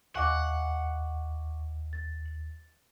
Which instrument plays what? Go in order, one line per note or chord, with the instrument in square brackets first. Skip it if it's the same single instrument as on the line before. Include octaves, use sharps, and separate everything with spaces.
[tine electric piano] D#2 [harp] D#5 F5 G#5 [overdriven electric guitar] F#5 [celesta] C#6 D6
[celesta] A6